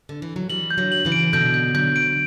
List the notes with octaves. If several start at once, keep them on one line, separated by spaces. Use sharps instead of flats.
D3
E3
F#3
E3 G3 F#7
G6
D3 F#3
F#7
C#3 E3
D7
B2 D3 G6
G6
D3 F#3 G6
D7